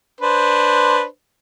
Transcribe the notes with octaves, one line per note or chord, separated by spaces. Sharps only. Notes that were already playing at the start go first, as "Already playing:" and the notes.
D4 B4 C5